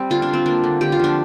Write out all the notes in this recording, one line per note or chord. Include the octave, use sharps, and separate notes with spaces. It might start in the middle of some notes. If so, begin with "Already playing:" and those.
Already playing: G3 C4
D3 F4
D4
D3 C4
A#3 D4
D3
D3 G4
F4
F3 D4